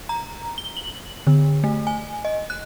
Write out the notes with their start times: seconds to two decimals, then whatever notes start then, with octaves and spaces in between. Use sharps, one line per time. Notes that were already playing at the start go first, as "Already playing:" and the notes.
0.09 A#5
0.58 G7
0.77 F#7
1.27 D3
1.64 A3
1.87 G#5
2.25 D#5
2.50 F#6